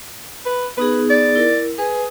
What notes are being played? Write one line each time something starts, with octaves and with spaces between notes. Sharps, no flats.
B4
B3 D#4 G#4 B4
D5
E4 A#4
G#4 B4